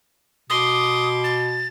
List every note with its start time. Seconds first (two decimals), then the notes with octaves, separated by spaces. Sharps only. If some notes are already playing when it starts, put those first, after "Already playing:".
0.50 B2 C6 D6 D#6
1.24 A6